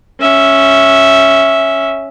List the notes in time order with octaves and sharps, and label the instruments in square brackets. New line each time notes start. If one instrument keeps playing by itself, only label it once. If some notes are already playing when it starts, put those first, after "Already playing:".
[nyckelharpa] C#4 E5